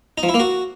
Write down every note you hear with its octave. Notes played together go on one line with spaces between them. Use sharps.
D#4
F3
E4
A#3
F#4